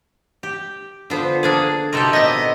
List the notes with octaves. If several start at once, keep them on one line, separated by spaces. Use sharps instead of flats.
G4
D3 B3 D4 F4 C5
A#3 D4 G#4 A4 D#6 A6
C3 D#4 F#4 G4 A4 A#4 C6 D#7
A#2 B3 D#5 D6 E6 B6